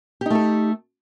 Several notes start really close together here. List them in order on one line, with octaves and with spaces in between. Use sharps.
G4 D#4 A3 A4